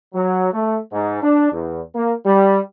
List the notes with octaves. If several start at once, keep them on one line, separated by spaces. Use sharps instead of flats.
F#3
A3
G#2
D4
E2
A#3
G3